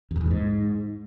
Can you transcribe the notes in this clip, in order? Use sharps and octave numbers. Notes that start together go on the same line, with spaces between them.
E2
F#2
E2
A#2
G#2